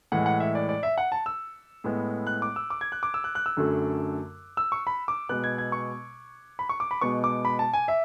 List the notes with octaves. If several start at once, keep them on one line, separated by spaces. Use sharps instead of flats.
A2 E3 G#3 F#5
F#5
E5
D5
D5
E5
F#5
A5
E6
A2 G#3 B3
F#6
D6
E6
D6
G#6
F#6
D6
E6
F#6
F#6
E6
F#2 D3 F#3 A3
E6
C#6
B5
D6
B2 G#3 B3 F#6
G#6
G#6
C#6
B5
C#6
D6
B5
B2 G#3 B3 C#6
D6
B5
A5
G#5
E5